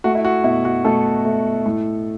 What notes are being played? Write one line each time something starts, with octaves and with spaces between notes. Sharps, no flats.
A3 F#4
E4
F#4
B2 E4
F#4
B2 A3 A4
A3
A2